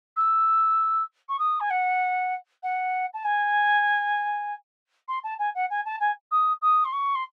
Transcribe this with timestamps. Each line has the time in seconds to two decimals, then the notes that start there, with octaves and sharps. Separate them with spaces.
0.16 E6
1.29 C#6
1.39 D#6
1.60 G#5
1.70 F#5
2.63 F#5
3.14 A5
3.24 G#5
5.08 C6
5.24 A5
5.39 G#5
5.55 F#5
5.70 G#5
5.85 A5
6.00 G#5
6.31 D#6
6.62 D#6
6.85 C6
6.92 C#6
7.15 C6